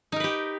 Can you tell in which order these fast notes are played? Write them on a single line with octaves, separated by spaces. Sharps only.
D#4 A#4 B4 G4